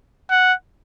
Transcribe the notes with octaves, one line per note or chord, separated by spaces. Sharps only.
F#5